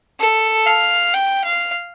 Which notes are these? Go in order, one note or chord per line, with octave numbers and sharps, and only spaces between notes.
A4
F5
G5
F5